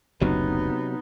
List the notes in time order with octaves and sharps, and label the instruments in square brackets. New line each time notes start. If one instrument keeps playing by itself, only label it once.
[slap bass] F#1 D2 [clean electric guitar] C3 F#3 [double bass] B3 D#4